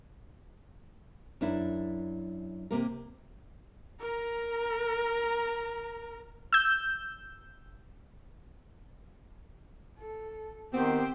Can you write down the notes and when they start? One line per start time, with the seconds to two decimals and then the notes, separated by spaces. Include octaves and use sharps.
1.41 F#2 D4 E4
2.71 C3 A#3 A#4
4.01 A#4 A#5
6.53 E6 G6
9.99 A4
10.73 D#3 B3 C4 G4 C5